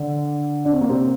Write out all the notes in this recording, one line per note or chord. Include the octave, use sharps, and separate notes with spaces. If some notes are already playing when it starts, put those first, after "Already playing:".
Already playing: D3 D4
D4
C4
A#3
C3 C4